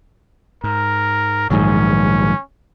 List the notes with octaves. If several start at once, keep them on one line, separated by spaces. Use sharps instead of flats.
G#2 A#4
A#1 G#2 D#3 F3 F#3 C#4